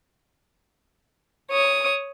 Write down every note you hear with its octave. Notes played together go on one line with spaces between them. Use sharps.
C#5 D#6